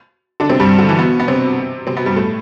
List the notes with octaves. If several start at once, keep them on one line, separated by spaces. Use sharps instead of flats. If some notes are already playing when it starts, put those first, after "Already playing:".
D3 D4
C3 C4
G2 G3
D3
E3
B2 B3
B3
C3 C4
C3 C4
B2 B3
G2 G3
A2 A3